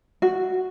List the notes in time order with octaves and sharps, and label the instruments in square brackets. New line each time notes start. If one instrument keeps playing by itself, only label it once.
[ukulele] F#4